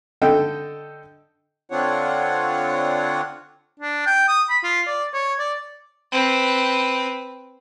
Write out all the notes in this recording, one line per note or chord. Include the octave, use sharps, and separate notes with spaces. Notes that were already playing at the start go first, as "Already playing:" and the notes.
D3 A4 D#5 G5
D3 C4 D4 F4 C#5 F#5
D4
G5
D#6
B5
F4
D5
C#5
D5
C4 B4